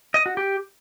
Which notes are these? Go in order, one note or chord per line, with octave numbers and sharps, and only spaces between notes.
D#5
F#4
G4